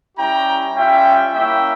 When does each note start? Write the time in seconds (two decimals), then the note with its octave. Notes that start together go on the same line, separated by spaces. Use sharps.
0.18 G3 C#4 E4 G4 G5 A#5
0.76 G3 C#4 F4 E5 G5
1.34 A#3 C#4 E4 E5 G5